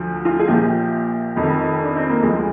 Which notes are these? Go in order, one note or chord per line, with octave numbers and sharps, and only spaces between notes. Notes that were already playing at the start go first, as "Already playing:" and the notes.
Already playing: D2 D3 F3
F4
G#4
A#1 A#2 F3 G4
F1 F2 D#3
D4
C4
A#3
D2 D3 F3 G#3